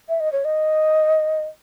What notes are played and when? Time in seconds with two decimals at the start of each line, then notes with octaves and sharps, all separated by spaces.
0.09 E5
0.20 D#5
0.33 C#5
0.45 D#5